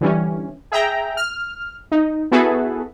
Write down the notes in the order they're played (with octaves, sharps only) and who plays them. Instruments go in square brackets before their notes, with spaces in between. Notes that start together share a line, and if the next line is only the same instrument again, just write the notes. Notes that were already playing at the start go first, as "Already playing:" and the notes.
[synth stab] D3 E3 G3 C#4
G#4 E5 G5 A#5
F6
D#4
B3 E4 F#4 G#4 A4 B4